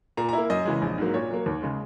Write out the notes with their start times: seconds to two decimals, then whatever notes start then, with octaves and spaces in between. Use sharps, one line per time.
0.17 A#2 A#5
0.29 A#5
0.33 E4
0.38 A#3
0.50 F#2 D#5
0.65 C#3 E3 G#3
0.82 A#1
0.98 G#2 F#3 A#3
1.14 A#2 C#5
1.31 F#3 A#3
1.46 D#2
1.63 C#3 G#3